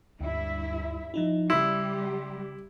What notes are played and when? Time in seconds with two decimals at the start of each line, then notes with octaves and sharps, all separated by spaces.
0.21 D2 G2 E4 E5
1.14 F3 D#4 E4
1.50 C#3 G3 E4 G4 C6